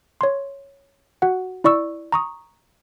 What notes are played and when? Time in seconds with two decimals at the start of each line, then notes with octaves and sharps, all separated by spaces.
0.21 C#5 C6
1.22 F#4 F#5
1.64 E4 D5 C#6 E6
2.12 A#5 C#6 D#6